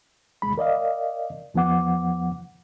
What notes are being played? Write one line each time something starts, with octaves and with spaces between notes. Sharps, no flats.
D2 B2 G#3 B5
A#4 D5 D#5 F5
E2 F3 B3 F#5 D6